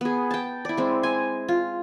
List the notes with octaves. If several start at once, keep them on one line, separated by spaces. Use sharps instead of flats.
B3 G#4
G5 A5
E4 D5
G#3 C4
G#5
F4